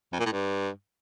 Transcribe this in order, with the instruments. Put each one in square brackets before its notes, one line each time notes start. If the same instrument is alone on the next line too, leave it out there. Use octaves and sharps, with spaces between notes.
[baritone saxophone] F2
A#2
A2
G2